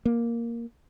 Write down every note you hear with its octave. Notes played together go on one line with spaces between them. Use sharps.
A#3